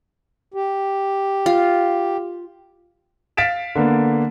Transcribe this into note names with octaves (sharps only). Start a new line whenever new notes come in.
G4
F4
F5 A6 B6 D7 E7
D3 A#3 B3